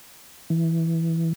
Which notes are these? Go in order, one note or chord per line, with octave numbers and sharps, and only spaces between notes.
E3